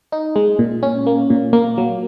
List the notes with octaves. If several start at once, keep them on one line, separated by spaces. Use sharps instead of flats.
D#4
G#3
A#2
C#4
A#3
A#2
A#3
F#3